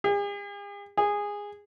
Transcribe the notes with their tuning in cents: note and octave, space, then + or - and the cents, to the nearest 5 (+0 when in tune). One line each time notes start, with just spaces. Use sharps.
G#4 -45
G#4 -15